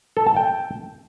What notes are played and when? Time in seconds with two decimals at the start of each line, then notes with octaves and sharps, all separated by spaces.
0.17 A4
0.27 A5
0.36 G5